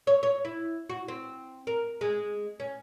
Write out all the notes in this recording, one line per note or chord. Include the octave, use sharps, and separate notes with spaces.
C#5
C#5
E4
F#4
C4
A#4
G#3
C#4